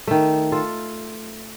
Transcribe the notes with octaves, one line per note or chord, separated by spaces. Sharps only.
D#3 A3
F4 A4